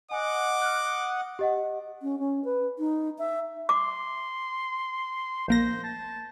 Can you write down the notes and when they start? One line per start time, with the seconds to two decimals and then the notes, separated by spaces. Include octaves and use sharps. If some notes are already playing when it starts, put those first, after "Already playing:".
0.11 D#5 F#5 G#5 D6
0.62 F6 F#6
1.39 G4 D#5 F#5
2.03 C#4
2.19 C#4
2.45 B4
2.79 D#4
3.19 E5
3.69 C6 D6
5.48 A#1 A#3 C5 A#6
5.84 A5